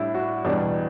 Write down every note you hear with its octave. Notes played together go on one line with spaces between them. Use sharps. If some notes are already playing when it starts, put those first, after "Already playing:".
Already playing: A2 G3 D4 E4
F#4
E2 B2 G3 D4